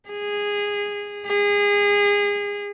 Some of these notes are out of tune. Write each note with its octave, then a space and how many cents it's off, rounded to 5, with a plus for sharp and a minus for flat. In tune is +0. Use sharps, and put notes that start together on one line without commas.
G#4 -15
G#4 -30